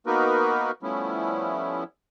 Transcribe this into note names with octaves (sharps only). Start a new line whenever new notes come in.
A#3 B3 D#4 F#4 A#4 B4
F3 G3 A3 B3 C#4 E4